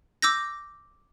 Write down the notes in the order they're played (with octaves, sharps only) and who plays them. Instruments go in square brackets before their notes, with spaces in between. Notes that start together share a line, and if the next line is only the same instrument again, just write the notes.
[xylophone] D6 E6 G6 A#6